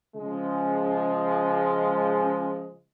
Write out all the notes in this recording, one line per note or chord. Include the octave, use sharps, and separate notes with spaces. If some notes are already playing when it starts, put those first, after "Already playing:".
C#3 F3 G#3